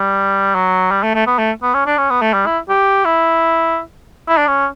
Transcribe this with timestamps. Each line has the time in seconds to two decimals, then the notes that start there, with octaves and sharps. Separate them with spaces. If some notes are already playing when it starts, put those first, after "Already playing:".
Already playing: G3
0.55 F#3
0.91 G3
1.03 A3
1.15 A3
1.27 B3
1.39 A3
1.63 B3
1.74 C#4
1.86 D4
1.98 C#4
2.10 B3
2.21 A3
2.33 G3
2.46 E4
2.69 G4
3.05 E4
4.28 E4
4.38 D4
4.48 C#4